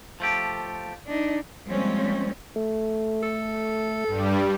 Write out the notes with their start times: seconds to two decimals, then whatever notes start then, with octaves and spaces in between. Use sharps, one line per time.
0.20 F3 A3 G4
1.06 D4 D#4
1.67 F3 G3 G#3 A#3 C4 C#4
2.56 A3
3.23 A4
4.07 G2 G3